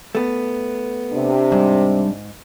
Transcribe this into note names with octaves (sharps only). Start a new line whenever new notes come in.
A3 B3
C3 D4
G#2 G3